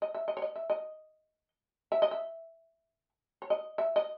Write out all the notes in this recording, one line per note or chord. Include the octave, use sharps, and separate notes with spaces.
D#5
E5
D#5
C#5
D#5
E5
D#5
E5
D#5
E5
C#5
D#5
E5
D#5